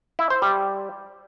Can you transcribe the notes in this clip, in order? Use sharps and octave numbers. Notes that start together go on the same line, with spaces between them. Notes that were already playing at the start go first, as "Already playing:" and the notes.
E4
C5
G3